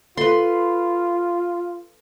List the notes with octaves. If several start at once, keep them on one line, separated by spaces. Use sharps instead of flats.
F4 A4 B4 C6